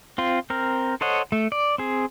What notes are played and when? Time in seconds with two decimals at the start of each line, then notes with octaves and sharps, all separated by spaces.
0.18 C4 F4
0.50 C4 A#4
1.01 A4 C5 C#5 D#5 F#5
1.32 A3
1.52 D5
1.78 C4 G#4